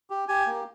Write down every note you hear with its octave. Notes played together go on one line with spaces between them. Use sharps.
G4
G4 G#5
A#3